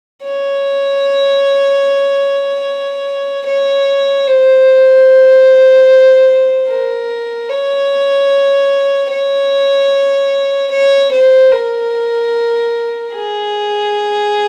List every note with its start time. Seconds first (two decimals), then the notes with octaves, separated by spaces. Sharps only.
0.24 C#5
3.47 C#5
4.27 C5
6.69 A#4
7.49 C#5
9.11 C#5
10.71 C#5
11.12 C5
11.52 A#4
13.13 G#4